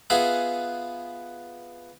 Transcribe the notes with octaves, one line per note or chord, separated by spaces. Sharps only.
B3 F4 G#4 E5 F#5 G#5